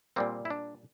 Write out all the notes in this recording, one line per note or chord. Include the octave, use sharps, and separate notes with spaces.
A#2 G3 A#3 C4
E4
D4